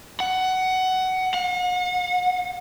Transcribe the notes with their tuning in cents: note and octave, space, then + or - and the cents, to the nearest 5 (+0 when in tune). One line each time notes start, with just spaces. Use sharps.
F#5 +15
F#5 -40